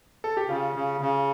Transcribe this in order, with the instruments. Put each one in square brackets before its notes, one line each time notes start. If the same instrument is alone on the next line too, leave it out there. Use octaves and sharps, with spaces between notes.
[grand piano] A4
G4
[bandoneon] C#3 [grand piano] F4
[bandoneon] C#3
C#3